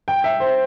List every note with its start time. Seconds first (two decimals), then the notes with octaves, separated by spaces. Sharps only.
0.08 G5
0.24 E5
0.40 C5